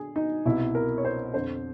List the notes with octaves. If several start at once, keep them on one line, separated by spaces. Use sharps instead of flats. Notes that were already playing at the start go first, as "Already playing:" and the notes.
Already playing: D3 G#4
D#4
C2 B2 E4
A#4
C#5
C5
F2 D3 C5